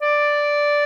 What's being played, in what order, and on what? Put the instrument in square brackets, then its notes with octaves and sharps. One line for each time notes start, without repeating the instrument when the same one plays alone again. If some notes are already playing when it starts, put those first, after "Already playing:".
[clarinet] D5